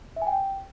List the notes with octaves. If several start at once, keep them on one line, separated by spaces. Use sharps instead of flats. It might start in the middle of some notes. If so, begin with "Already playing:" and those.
E5
G#5
G5